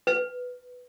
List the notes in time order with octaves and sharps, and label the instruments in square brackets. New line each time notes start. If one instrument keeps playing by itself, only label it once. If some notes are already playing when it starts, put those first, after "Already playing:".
[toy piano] B4